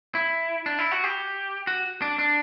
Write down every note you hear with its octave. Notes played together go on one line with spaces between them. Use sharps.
E4
D4
E4
F#4
G4
F#4
D4
D4